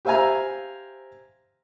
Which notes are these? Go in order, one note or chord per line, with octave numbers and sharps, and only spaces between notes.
G4 C5 E5 F5 G#5 A#5